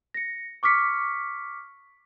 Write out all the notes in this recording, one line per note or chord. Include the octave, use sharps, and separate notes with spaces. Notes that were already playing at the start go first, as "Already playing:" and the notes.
A#6 C#7
C#6 D6 F6 B6 C#7